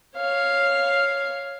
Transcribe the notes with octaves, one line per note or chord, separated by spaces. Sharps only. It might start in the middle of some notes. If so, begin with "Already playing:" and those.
C#5 F5